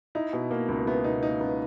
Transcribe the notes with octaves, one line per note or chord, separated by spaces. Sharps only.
D#4 E4
B2
A#3
C#2
B3 E4
B2 D#4
A#3 D#4
C#2 B3